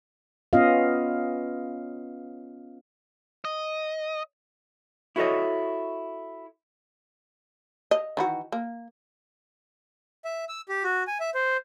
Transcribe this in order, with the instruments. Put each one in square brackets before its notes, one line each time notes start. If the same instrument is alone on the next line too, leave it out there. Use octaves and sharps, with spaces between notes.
[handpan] B3 C#4 F4 D#5 F5
[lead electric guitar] D#5
[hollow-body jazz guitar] E4 F#4 A4 B4 C#5 D#5
[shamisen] D#5
D#3 E3 F#4
A#3
[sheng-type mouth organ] E5
E6
G4
F#4
G#5
E5
C5